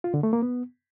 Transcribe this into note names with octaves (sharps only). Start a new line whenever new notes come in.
F4
D3
A3
A#3
B3